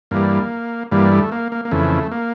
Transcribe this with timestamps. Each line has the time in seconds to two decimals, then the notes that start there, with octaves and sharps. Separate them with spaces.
0.11 G2 E3 G3 A#3
0.92 G2 E3 G3 A#3
1.12 A3
1.32 A#3
1.52 A#3
1.65 A#3
1.71 F2 C#3 E3 A3
2.12 A#3